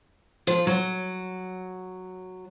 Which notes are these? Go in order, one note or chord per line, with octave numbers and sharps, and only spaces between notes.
F3
F#3